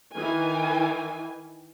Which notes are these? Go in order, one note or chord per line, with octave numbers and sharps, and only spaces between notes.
D#3 E3 G#5